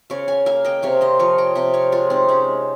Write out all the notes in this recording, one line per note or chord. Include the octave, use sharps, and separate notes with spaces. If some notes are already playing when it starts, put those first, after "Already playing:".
C#3 C#5 F5
F5 G#5
A#3 F5 G#5
D#5 G5
C3 C#5 F5
C5 D#5
F3 C#5 F5
D#5 G5
C3 D#5 G5
C#5 F5
G#3 F4 G#4
C4 D#4
G#3 C#4